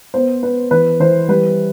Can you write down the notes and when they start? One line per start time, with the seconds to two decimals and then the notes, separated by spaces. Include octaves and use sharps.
0.14 B3 C5
0.43 B3 B4
0.71 E3 B4
1.00 E3 C5
1.28 G3 B4